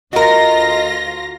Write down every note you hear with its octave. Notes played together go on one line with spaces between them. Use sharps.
D2 F4 F#4 A#4 D#5 A#6